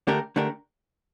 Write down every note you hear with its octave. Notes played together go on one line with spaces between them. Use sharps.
D3 A3 D4 G4 A#4
D3 A3 D4 G4 A#4